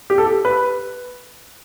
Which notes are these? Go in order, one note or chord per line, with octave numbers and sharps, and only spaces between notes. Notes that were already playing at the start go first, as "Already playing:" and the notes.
G4
A4
G4
B4